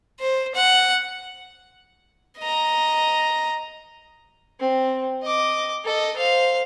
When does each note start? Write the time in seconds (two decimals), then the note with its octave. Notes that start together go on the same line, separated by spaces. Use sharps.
0.19 C5
0.55 F#5
2.39 D#5 A#5
4.60 C4
5.23 D#5 D6
5.84 A4 D#5
6.16 C5 F5